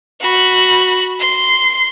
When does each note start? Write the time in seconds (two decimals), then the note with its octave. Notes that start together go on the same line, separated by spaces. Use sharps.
0.21 F#4 B5
1.20 C6